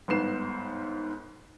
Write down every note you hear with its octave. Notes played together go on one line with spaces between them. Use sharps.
G1 G#2 B3 C7 E7